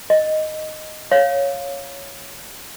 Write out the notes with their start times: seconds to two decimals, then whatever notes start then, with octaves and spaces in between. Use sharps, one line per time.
0.10 D#5
1.11 C#5 F5